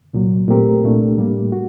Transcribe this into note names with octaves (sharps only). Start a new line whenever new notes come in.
C2 A#2 F#3
A#2 A3 C4 G4 A#4
C2 A#2 A3 D4
A2 G3 A#3
F#4